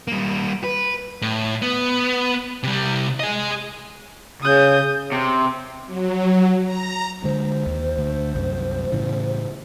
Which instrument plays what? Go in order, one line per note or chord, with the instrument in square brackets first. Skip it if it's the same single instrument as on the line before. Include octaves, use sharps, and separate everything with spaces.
[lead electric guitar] G3 A#3
B4
A2
B3
C3 G3
G#4 D#5
[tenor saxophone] C#3 [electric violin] D#6 G6
[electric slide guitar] C3
[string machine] F#3
A#5
[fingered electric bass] D3 G#3 [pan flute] C5
[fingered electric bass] D#2
D2
C2 F#2
A2 C#3 E3